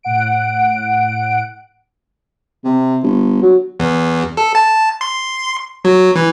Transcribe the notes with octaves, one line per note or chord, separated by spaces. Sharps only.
A2 F#5 D7
C3
G1
F#3
E2
A4
A5
C6
F#3
E3